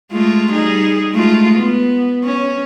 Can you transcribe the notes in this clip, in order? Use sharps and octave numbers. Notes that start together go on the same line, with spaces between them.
G#3 A3 F4
G3 D#4 G#4
G#3 A3 F4
B3
C#4